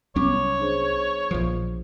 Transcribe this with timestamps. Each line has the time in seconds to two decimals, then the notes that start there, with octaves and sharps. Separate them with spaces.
0.16 C2 F#3 B3 C#4 C#5 D6
0.59 D4 G#4 C5
1.31 A#1 F3